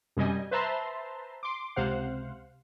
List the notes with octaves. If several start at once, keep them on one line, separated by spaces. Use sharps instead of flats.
F#2 C3 G3 D#5 G#5
B4 C5 E5 A5 A#5 C6
C6 D6
C#2 C3 C5 F5 F#5